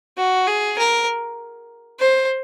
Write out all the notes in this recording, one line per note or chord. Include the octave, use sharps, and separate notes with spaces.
F#4
G#4
A#4
C5